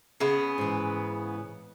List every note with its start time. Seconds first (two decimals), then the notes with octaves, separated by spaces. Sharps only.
0.20 C#3 B3
0.58 G#2 E3